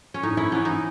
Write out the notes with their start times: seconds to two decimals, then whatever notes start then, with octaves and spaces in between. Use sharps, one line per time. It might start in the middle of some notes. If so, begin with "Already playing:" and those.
0.14 C#4
0.23 A2 D#4
0.37 C#4 E4
0.52 E3 B3 C#4
0.65 D#4